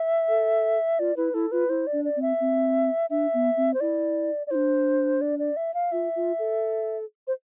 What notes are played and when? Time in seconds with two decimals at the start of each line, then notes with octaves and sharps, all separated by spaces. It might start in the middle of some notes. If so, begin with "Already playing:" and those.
Already playing: E5
0.29 A4
0.99 F4 D5
1.17 E4 B4
1.34 E4 A4
1.52 F4 B4
1.69 E4 C5
1.87 D5
1.92 D4
2.05 D5
2.16 C4
2.22 E5
2.40 C4
3.10 D4 E5
3.34 B3
3.57 C4
3.74 C5
3.80 E4 D5
4.47 D5
4.51 E4 C5
4.55 D4
5.21 D5
5.39 D5
5.56 E5
5.74 F5
5.92 F4 E5
6.16 F4
6.39 A4
7.27 C5